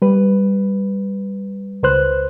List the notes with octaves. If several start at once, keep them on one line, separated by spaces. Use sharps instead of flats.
G3 B4
C#2 B4 C5 F#6